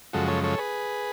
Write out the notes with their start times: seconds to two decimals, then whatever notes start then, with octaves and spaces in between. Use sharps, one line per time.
0.13 F#2 C#3 F3 G#3 F#4 A4
0.28 A4 C#5
0.44 A4 C#5
0.58 G#4 B4